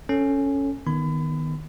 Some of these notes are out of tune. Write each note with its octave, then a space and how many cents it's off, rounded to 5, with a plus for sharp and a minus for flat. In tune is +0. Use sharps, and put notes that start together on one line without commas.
C#4 +0 A4 +5
D#3 +0 B3 -10 B5 +30